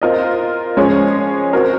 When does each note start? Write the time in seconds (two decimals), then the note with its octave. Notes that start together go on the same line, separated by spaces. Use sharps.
0.02 C4 F4 A#4 D#5
0.77 F3 G#3 C#4 G#4 C#5
1.53 C4 F#4 A#4